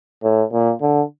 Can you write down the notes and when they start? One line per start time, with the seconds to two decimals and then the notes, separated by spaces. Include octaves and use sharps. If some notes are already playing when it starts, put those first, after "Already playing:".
0.23 A2
0.52 A#2
0.81 D3